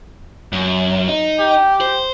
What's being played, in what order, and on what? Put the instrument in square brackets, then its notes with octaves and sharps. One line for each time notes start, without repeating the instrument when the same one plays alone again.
[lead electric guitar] F#2
D#4
[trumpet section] G4
[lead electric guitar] C5